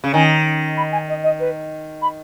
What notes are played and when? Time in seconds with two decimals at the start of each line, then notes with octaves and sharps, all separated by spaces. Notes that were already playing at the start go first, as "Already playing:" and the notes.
0.04 C#3
0.13 D#3 G#5
0.77 B5
0.92 G#5
1.08 D#5
1.23 D#5
1.39 B4
2.02 B5